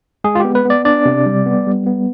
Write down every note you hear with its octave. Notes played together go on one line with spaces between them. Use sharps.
G#3 G#4
F4
B3 G4
B4
B3 D5
D4 D5
C3
G3
B3
G3
B3